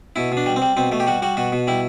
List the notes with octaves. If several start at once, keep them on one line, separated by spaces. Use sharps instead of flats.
B2 E4
B2
D4
G3
C4
G3
B2 C4
B2 A3
G4
G3 F#4
G3 F#4
B2 F#4
B2
G3 E4